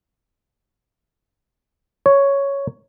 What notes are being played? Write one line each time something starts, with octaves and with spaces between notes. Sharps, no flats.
C#5